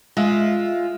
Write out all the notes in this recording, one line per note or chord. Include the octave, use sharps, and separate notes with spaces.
G#3 F4 E5